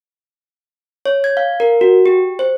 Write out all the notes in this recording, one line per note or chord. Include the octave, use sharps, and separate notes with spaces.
C#5
G#6
F5
A#4
F#4
G4
C5